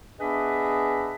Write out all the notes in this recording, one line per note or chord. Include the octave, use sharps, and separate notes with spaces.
B3 D4 G#4 B4 D#5 E5